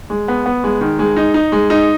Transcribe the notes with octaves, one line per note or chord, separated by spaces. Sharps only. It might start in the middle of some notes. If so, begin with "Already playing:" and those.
G#3
B3
B3
G#3
D#3
G#3
D#4
D#4
G#3
D#4